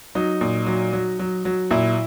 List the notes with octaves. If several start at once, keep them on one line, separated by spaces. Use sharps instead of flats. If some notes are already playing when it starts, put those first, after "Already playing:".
F#3 D#4
A#2
F#3
F#3
F#3
F#3
A#2 E4